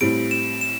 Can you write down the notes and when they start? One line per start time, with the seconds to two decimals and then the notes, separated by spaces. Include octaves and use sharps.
0.01 A2 G3 C4 D7
0.31 E7
0.61 E7